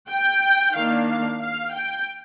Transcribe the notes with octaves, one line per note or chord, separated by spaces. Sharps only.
G5
D#3 A#3 D4 F5
F5
F5
G5